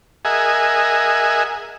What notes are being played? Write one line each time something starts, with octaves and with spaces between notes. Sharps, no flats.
G#4 A#4 D#5 E5 F#5 G#5